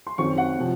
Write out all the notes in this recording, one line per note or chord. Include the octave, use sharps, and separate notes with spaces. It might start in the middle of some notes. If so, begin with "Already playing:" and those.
C6
F#2 D#3 F#3 C4 C#6
F#5
C3 F3